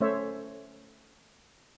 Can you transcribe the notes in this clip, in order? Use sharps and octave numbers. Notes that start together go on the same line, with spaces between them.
A3 C#4 C5 C#5 E5